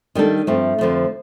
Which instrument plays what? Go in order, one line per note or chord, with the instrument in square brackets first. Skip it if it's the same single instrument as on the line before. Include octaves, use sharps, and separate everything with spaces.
[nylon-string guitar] D#3 G3 D4 A4
G2 F3 A3 C4
F2 D3 F3 A3